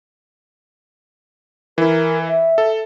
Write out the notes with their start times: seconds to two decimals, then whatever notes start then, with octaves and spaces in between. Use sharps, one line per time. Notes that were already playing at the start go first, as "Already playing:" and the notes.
1.78 E3 E4 A#4
2.28 E5
2.58 A4